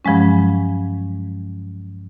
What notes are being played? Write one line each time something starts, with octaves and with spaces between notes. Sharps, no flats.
G2 F3 F#3 G#3 C#4